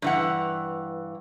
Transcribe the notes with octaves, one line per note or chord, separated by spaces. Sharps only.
G2 E3 F#5